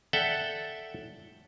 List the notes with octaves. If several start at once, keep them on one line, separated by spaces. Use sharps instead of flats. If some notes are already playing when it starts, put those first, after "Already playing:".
A4 D5 E5 F#5 G5